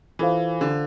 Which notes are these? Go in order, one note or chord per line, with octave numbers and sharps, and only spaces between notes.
E3 F4 A4 C5 F5
D3